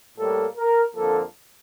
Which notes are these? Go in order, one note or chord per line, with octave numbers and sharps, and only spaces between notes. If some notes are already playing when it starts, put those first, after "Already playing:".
A2 G3 A#3 A4
A#4
F2 D3 F3 A#3 A4